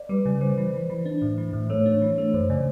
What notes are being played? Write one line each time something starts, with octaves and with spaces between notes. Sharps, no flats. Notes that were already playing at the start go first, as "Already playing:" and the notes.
Already playing: D5
G3 B4
C#3
G3 C5
E3
E3
E3
D4
A2
E3
A2
A3 C#5
D4
E3
A3
F#2 C5
C#3 D5